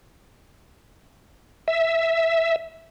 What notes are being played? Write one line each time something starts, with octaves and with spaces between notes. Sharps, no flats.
E5